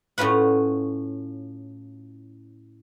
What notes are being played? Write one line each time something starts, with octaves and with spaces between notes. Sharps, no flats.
A2 C#4 F4 B4 F#5